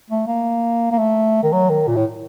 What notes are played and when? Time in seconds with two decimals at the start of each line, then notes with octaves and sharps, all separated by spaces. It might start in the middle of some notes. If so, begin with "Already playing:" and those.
0.10 A3
0.27 A#3
0.92 A#3
0.98 A3
1.43 D#3
1.52 F#3
1.70 D#3
1.88 A#2
1.96 A2